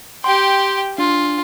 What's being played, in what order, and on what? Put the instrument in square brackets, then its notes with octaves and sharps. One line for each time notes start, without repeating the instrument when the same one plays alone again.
[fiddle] G4 G5 [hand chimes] C6
[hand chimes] D4 [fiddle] F4